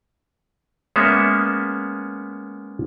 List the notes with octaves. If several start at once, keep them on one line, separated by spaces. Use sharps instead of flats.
G#3 A#3 B3 C#4 E5